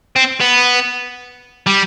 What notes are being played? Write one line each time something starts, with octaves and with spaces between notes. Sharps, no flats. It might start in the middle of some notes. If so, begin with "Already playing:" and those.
C4
B3
G3